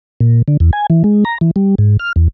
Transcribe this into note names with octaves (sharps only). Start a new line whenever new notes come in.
A#2
D3
E2
G#5
E3
G#3
A#5
E3
G3
G#2
F6
E2